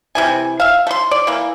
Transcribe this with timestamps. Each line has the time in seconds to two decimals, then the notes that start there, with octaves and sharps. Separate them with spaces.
0.15 C3 E3 G#5
0.60 E5 F5
0.87 A3 C6
1.11 D5
1.27 E3 A#3